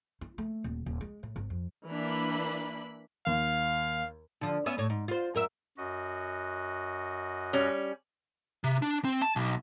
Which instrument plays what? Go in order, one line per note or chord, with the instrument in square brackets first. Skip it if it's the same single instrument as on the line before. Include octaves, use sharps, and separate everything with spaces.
[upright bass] E4
A3
D#1
D#1
G#3
A2
G#1
F2
[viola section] E3 A#3 D4 B5
[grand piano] D#2 [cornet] F5
[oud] D3 F3
B3 C#4 E5
A2 C#5
G#2
F4 C5
F#2 A#4 E5
[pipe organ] F#2 F#4 D#5
[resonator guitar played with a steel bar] G3 C#4
[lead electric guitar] C3
D4
C4
A5
B1